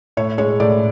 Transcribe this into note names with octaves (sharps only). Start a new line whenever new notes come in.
A2 C#5
G#3 C#5
A2 D5